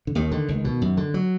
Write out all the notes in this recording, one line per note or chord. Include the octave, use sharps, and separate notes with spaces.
D3
D#2 D#3
D3
C#2
B2
F#2
D3
F#3